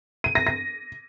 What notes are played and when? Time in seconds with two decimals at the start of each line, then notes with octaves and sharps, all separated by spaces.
0.24 D#7
0.35 A#6
0.47 A#6